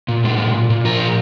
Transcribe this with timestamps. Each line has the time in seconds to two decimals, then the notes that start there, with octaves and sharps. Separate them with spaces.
0.08 A#2
0.24 G#3
0.40 A#2
0.54 A#2
0.70 A#2
0.84 F3 A#4
1.00 A#2